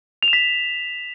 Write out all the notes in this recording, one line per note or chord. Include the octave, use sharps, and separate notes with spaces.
F7
E7
B6